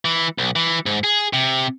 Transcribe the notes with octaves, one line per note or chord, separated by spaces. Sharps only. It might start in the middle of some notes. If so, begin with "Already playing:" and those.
E3
B1
E3
G#2
G#4
C3